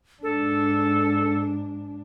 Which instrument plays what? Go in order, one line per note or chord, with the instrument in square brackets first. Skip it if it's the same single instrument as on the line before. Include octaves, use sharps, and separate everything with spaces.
[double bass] G#2 D4 [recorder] A4